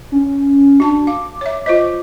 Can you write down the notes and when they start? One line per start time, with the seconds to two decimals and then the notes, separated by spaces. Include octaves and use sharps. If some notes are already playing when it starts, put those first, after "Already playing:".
0.12 C#4
0.80 D4 F#4 A5
1.07 F5 D6
1.41 C#5 E5
1.66 F4 C5 D#5